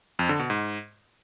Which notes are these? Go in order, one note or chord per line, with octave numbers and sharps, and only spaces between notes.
F2
D3
B2
G#2